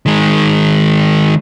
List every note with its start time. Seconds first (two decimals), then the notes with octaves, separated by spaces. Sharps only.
0.06 D#3 G#3